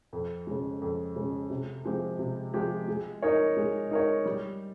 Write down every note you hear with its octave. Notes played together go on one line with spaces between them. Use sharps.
F2
C#3 G#3
F2
C#3 G#3
C3
F3 G#3 C4 G4
C3
F3 G#3 C4 G4
G#3
D#4 A#4 C#5
G#3
D#4 A#4 C#5
G3